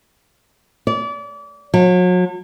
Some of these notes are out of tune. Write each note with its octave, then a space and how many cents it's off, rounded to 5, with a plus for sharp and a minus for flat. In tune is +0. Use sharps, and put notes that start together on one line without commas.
D5 -30
F#3 -35